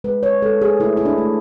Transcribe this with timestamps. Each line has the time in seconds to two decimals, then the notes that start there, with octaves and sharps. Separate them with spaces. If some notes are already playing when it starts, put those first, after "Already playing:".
0.04 G#3 B4
0.23 C#5
0.42 G#3 A4
0.62 G#4
0.80 A3 E4
0.97 E4
1.05 D4
1.18 A3